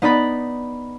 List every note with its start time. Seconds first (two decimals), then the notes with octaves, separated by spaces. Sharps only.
0.02 B3 D#4 D5 B5